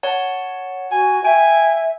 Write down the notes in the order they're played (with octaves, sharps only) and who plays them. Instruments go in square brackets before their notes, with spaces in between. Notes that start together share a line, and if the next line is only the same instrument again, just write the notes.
[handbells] C#5 F#5 A5
[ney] F#4 [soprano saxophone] G#5
[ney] E5 [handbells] G5 [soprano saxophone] G#5